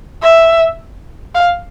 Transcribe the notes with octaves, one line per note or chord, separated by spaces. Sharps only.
E5
F5